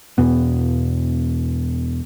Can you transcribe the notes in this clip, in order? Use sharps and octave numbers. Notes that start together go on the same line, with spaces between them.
E2 B2 B3